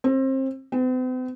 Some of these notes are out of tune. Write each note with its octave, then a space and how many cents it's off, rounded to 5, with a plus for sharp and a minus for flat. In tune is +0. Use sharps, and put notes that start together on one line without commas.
C4 +30
C4 -45